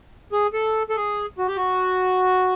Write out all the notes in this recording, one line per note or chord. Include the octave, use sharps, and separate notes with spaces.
G#4
A4
A4
G#4
F#4
G4
F#4